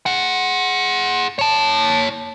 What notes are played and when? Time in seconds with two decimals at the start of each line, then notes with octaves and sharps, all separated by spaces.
0.06 G#4 F#5
1.39 C#5 A5